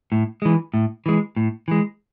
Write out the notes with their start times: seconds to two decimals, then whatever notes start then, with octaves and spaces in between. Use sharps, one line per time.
0.12 A2
0.42 E3 G#3
0.74 A2
1.06 E3 G#3
1.36 A2
1.68 E3 G#3